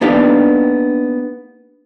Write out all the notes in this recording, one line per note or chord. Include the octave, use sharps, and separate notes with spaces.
A#3 B3 D4 D#4 G4 F5